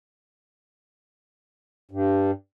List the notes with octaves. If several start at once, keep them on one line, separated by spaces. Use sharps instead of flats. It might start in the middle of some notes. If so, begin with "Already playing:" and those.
G2